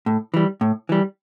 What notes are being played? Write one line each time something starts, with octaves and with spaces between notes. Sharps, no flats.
A2
E3 G3
A2
E3 G3